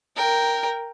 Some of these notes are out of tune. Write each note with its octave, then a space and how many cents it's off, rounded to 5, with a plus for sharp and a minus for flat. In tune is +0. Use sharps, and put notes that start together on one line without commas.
A#4 +0 G5 +0